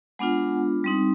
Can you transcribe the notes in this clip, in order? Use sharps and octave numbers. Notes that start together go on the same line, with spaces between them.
G#3 B3 D4 F4 F#5 G#5
G3 C4 D#4